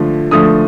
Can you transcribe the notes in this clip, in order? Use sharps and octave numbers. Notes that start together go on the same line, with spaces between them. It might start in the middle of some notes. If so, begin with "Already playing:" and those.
Already playing: D3 F3 A3
D3 F3 A3 D#6